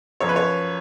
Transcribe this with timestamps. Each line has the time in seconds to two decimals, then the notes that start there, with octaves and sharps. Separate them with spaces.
0.20 F#2 F3 C#5
0.29 B4
0.36 C#5